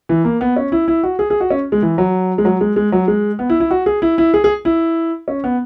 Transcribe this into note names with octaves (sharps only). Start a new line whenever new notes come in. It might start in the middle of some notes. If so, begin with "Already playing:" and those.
E3
A#3
B3
C#4
E4
E4
F#4
G#4
G#4
F#4
C#4
G#3
E3
F#3
G#3
F#3
G#3
G#3
F#3
G#3
B3
E4
E4
F#4
G#4
E4
E4
G#4
G#4
E4
C#4
B3